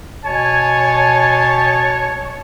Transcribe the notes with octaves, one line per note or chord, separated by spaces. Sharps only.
B2 C#5 G#5 A5